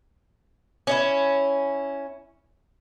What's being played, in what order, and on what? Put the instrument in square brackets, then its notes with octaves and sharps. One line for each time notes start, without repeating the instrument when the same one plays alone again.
[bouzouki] C#4 D#4 E4